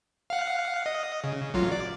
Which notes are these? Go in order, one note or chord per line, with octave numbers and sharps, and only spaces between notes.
F5 F#5
D#5
C#3
A1 F#3 F4
D5